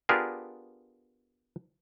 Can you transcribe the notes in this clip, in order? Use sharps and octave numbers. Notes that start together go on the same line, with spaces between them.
B3 D4 F4 G4 G#4 A#4